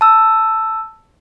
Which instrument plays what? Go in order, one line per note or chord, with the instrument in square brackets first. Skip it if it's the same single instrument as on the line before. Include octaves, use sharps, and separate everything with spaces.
[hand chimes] A5 E6